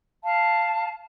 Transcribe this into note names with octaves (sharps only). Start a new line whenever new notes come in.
F5 A5